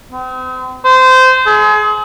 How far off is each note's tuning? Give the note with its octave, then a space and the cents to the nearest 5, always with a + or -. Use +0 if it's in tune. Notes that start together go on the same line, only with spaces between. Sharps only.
C4 -40
C5 -20
G#4 +35